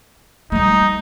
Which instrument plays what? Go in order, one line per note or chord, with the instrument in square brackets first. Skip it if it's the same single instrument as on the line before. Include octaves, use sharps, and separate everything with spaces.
[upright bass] G3 A3 [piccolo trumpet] D#4